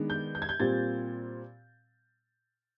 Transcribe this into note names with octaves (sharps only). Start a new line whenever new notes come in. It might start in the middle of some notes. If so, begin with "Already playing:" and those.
Already playing: D#3 G#3 B3 D4
G6
G6
G#6
G6
A#2 G3 C4 A6